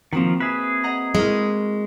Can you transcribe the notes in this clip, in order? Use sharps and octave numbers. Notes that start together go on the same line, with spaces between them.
D#3 F3 A#3 C4 F#4
G#4 B4 E5
D#5 F#5 A#5
G#3 E4 F#4 A#4